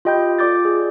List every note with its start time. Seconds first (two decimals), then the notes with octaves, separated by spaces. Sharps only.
0.05 F4 G4 D#5 G5 B5 G6
0.39 F4 A4 D5 D6 G6 A6
0.65 G#4